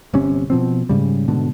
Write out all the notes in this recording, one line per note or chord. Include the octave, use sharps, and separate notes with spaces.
G1 C3 C#4
B2 F3 C4
G#2 C#3 G3
G#2 B2 D3